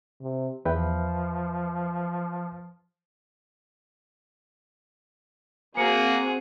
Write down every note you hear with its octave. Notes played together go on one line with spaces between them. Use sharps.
C3
E2 F3 B4 E5 G5
A#3 C4 F#4 G#4 C5 C#7